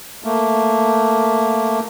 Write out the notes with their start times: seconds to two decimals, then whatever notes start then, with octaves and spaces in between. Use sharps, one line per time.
0.24 A3 A#3